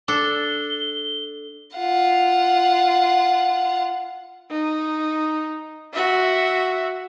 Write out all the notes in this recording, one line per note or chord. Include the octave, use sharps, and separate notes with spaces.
D4 A4 G7
F4 F#5
D#4
F#4 E5